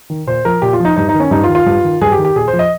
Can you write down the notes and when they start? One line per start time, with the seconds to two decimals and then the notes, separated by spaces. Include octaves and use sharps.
0.10 D#3
0.27 A#2 C5
0.45 F3 A#4
0.62 A#2 G4
0.73 F4
0.80 F3 D#4
0.96 G2 D#4
1.09 D#4
1.14 D#3
1.20 C#4
1.31 G2 D#4
1.44 F4
1.49 D#3
1.55 F4
1.66 G2
1.84 D#3
2.01 G2 G#4
2.12 G4
2.18 D#3
2.25 G4
2.36 A#2 G#4
2.48 C5
2.53 F3
2.59 D#5